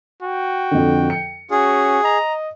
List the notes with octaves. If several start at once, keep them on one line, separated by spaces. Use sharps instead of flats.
F#4 G5
F2 D3
C#7
C#4 F#4 G#4
D#5 A#5